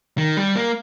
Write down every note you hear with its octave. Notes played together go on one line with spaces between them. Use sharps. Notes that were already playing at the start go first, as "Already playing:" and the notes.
D#3
G3
A#3